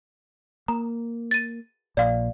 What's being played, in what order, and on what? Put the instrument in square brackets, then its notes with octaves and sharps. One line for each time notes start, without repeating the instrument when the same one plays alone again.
[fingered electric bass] A#3 [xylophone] A#5
[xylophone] A6 D#7
[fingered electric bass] A#1 A#2 [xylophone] D5 F5